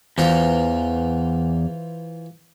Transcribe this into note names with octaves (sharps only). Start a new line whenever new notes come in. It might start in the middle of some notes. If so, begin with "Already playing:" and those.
E2 E3 F4 C5